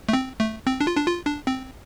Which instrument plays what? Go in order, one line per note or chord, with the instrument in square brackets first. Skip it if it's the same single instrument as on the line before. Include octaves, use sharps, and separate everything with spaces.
[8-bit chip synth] A3
C4
A3
C4
D4
F4
D4
F4
D4
C4